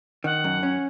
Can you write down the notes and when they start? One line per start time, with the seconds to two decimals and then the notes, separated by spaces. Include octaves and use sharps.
0.24 D#3 F#5
0.44 F#2
0.63 C#4